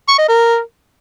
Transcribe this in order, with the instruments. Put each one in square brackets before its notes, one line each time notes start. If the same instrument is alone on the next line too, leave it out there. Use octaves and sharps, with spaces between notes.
[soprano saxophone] C#6
D#5
A#4